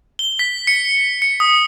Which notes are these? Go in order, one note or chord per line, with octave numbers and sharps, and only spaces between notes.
G7
B6
C#7
C#7
D#6